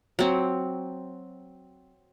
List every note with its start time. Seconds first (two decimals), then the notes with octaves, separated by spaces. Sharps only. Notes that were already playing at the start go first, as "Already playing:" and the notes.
0.19 F#3 C4